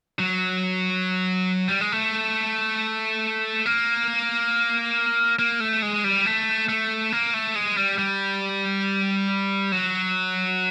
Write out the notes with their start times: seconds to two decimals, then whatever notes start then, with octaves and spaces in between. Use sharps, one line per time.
0.19 F#3
1.69 G3
1.81 G#3
1.92 A3
3.66 A#3
5.39 A#3
5.60 A3
5.82 G#3
6.04 G3
6.26 A3
6.69 A3
7.12 A#3
7.34 A3
7.55 G#3
7.77 G3
7.98 G3
9.72 F#3